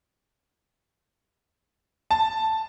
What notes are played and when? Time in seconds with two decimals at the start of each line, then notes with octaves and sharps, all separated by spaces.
2.11 A5